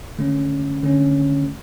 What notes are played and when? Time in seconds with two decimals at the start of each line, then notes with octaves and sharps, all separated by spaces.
0.19 D3 A3 C#4
0.83 D3 A3 C#4